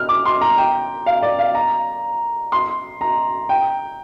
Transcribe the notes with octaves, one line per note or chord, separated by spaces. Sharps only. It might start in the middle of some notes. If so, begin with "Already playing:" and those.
Already playing: F6
D6
C6
A#5
G5
F5
D5
F5
A#5
C6
A#5
G5